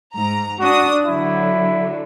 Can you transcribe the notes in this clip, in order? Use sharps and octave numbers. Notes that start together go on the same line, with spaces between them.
G#2 A#5
D4 F#4 D#6
D3 F#3 E4